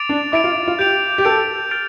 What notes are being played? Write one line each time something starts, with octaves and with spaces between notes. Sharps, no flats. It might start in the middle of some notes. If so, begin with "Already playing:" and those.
Already playing: D6 A6 D7 F7
D4
E4 D6 A6 D7 F7
F4
F4
G4 G6 D7 F7
G4
A4 G6 D7 F7
F6 A6 D7 F7